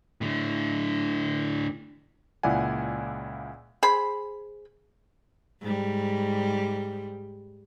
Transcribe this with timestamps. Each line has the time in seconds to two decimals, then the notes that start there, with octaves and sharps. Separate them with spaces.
0.21 A2 D3
2.43 C#2 A#2 E4 D5 F#5 G#5
3.83 G#4 C5 B5
5.62 G#2 G3